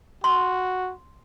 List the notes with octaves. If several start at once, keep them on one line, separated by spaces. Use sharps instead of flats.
F#4 C6